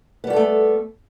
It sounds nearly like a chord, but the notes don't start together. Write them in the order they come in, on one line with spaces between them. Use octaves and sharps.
B3 G3 F#4 A4 A3